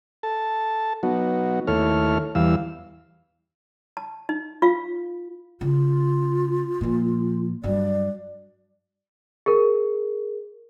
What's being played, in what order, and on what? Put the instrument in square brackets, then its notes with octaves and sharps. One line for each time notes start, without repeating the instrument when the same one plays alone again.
[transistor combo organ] A4 A5
F#3 B3 D#4 F#4
D#2 A3 E4 A4 C#5 F6
E2 E3 G3 F5 E6
[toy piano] A5
D#4
F4 F5
[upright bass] C#3 [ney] F4
[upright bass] A#2 F3
[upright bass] G2 F#3 [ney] D5
[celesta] G#4 A#4